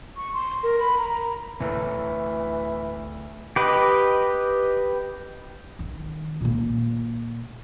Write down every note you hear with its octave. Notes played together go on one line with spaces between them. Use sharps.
C#6
C6
A#4
B5
A#5
A#5
D2 A2 E3 A3
G4 B4 D#5
D#3
A#2 A#3